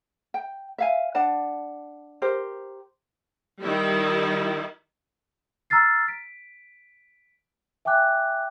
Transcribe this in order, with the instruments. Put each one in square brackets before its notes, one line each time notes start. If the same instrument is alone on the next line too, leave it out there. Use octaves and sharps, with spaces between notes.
[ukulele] G5
E5 F5 G#5
D4 D5 F#5 A5
G4 A#4 C5
[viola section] D#3 G3 E4
[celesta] A#5 E6 F6 A6 C7
B6 D7
E5 G5 G#5 D6 F#6